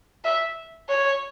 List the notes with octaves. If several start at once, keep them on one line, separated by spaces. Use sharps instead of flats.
E5
C#5